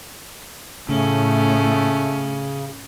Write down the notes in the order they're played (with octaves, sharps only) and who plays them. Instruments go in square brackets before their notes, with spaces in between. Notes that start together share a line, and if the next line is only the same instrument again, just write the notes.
[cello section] A2 [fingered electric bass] C#3 [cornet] A3 [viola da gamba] C#4